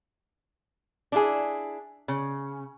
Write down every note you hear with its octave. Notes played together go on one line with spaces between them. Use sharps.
D4 E4 G#4
C#3